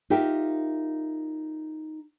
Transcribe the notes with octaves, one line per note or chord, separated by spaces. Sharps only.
D#4 F4 G4 A#4 E5